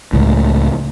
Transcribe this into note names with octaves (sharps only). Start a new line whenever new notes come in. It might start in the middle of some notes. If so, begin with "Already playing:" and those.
C#2 A2